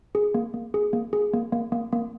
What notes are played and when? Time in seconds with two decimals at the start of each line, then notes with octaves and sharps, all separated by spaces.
0.15 G#4
0.34 A#3
0.54 A#3
0.74 G#4
0.93 A#3
1.13 G#4
1.34 A#3
1.52 A#3
1.72 A#3
1.92 A#3